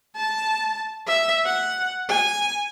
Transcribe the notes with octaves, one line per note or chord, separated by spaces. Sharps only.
A5
E5
F#5
G#5